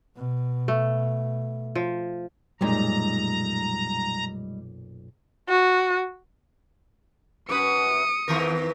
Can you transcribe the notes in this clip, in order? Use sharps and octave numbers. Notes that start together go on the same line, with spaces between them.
B2
A3
F3
B1 F#2 A#2 G3 G#3 D#4 A#5
F#4
F#2 B4 D#6 C#7
E2 D#3 A#4